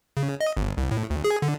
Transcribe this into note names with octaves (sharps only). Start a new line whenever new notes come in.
C#3
D#5
G1
C2
A2
D2
G#4
D3